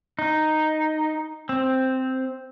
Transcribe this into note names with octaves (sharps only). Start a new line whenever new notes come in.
D#4
C4